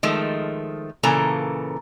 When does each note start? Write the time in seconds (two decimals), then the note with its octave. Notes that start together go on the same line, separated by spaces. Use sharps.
0.03 D#3 F3 G#3 A3
1.03 A#2 C#3 E3 A#3 A4 A#5